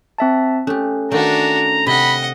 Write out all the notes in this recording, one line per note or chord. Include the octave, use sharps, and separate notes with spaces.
C4 E5 A5
A3 C#4 G4
D#3 A3 D4 F#4 A#5
C3 D#5 F#5 B5